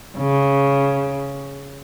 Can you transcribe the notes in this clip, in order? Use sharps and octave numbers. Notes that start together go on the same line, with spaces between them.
C#3